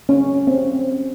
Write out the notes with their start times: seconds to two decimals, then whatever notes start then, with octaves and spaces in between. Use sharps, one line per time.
0.09 C#4
0.47 C4